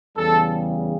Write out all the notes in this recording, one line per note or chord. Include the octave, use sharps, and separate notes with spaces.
E2 C#3 G3 A4